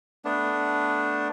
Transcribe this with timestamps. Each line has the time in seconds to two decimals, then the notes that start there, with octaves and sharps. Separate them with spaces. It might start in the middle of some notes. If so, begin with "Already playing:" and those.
0.25 A3 B3 D4